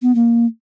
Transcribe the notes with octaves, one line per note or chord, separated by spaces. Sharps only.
B3
A#3